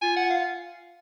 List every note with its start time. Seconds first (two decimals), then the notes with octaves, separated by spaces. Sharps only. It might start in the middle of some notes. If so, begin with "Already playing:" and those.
0.02 F4 G#5
0.16 F#5
0.30 F5